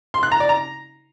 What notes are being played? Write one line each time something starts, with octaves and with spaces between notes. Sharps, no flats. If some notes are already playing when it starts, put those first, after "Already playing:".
C6
F#6
A#5
D5
A#5